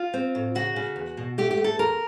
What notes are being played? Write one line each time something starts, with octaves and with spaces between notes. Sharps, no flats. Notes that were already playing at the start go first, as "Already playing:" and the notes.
Already playing: F4
C4
A2
C#3 F#4
C#3
E2
B2
A3 G4
G4
A3
A4
E2 A#4